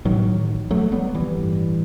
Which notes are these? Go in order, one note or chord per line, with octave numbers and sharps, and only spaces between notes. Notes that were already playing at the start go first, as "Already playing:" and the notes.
A1 A2 D#3 F#3
F#3 A3
G3 B3
E3 G3
A1 G2